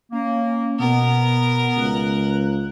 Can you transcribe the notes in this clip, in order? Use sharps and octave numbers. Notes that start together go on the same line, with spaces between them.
A#3 C#4
B2 B3 A#4
C#2 F#6